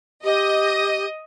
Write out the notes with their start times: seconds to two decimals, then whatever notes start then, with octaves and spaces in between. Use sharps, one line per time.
0.24 G4 D#5